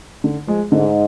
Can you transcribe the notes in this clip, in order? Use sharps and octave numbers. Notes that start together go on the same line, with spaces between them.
D3
F3 G#3
G#2 D3